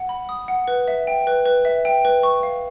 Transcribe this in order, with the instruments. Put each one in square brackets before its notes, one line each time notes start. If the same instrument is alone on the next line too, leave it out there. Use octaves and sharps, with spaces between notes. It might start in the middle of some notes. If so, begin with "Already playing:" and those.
Already playing: [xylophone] F#5
B5
D#6
F#5
B4
E5
G5
B4
B4
E5
G5
B4
C#6
F5